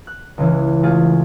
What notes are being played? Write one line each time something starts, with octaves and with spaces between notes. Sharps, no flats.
F#6
C#2 C#3 E3
A3 F4 G#4